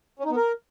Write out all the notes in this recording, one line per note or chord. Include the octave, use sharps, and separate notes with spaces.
C#4
D#4
B3
A#4